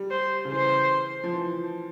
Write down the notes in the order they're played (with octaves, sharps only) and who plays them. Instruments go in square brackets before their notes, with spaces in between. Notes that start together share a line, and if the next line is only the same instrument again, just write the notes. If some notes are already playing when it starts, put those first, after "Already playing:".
Already playing: [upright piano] G3
[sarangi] C5
[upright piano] C#3
[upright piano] E3 [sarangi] C5
[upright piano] F3
E3